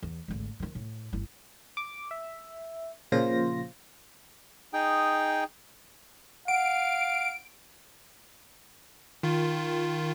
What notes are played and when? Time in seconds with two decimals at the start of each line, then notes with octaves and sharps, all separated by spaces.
0.03 E2
0.28 G#1 D2
0.60 D#3 F3
0.75 A2
1.13 G1 E4
1.77 D6
2.11 E5
3.12 A#2 C#3 F3 F4 C5 A#6
4.74 D#4 G#4 G5
6.48 F5 F#5 D7
9.23 D#3 F4